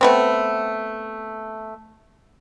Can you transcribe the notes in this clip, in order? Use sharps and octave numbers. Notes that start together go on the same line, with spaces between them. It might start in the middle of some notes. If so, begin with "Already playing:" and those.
A3 B3 C4